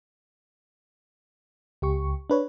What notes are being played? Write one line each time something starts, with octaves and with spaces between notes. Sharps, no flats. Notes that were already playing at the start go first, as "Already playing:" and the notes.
C#2 G4 C#6
D4 B4 C#5